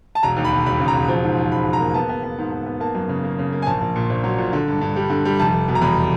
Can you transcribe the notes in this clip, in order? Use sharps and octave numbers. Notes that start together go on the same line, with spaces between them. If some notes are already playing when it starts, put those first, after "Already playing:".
A5
E1 A#5
D#2
B5
E1
E1 B5
C#3
A#5
E1
F3
G#2
F3
G#2 B5
F3
A#5
A#3
B3 A5
B3
B3
G#2
G#2
B3
A#3 A5
F#2
C#3
A#3
C#3
A#3
G#5
A#1 A5
A#1
A#2
A#1
F#3
A#2
D3
G2
G2
G3
D3
G3
F1 A5
F1
B2
A#5
E2 B5